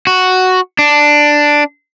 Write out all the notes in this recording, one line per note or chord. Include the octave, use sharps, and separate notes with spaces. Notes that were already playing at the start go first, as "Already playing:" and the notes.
F#4
D4